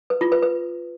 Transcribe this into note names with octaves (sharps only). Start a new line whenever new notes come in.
B4
F4
B4
B4